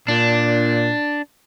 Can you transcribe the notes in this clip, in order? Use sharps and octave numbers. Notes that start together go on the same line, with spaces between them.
A#2 D4